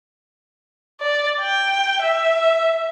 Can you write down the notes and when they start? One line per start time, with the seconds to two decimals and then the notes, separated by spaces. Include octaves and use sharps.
1.01 D5
1.41 G5
2.02 E5